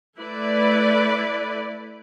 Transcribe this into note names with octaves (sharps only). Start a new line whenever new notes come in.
A3 E4 B4 D5